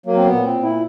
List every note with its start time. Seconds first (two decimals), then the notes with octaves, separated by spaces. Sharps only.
0.06 F#3 A#3
0.16 C4
0.25 B3
0.31 A#2
0.44 C4
0.56 A#2
0.63 E4